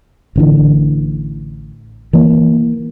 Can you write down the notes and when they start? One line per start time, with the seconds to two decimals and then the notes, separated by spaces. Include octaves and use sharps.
0.36 A1 D3 E3
2.13 E3 A#3